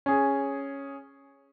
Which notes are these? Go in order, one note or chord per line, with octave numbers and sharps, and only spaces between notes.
C#4 G#4